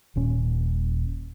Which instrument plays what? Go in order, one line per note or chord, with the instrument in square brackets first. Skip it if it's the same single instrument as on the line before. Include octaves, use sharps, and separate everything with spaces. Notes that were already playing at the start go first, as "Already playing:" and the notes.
[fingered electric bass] D#1 A#2 C#4